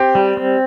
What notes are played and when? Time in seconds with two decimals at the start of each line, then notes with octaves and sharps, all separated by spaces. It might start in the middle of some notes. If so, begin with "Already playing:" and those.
Already playing: C4 G4
0.15 G3
0.37 C4